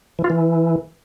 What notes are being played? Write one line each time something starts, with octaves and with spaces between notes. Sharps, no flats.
E3
F4
E3